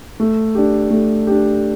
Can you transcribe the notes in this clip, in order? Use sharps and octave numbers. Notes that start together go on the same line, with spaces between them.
A3
D4 G4
A3
D4 G4